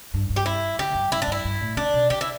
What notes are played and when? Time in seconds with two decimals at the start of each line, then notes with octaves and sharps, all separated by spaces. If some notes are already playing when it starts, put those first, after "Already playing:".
0.14 G2
0.30 G2
0.36 G4
0.46 E4
0.78 D3 G4
0.95 G2
1.12 G2 E4
1.22 D4
1.28 G2 E4
1.45 G2
1.61 A2
1.77 D3 D4
1.93 B2
2.10 D3 G4
2.21 E4